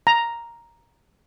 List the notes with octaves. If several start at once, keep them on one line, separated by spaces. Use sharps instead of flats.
A#5